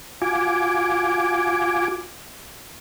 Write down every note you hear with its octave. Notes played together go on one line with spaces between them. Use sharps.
F4 F#4 G#5 D6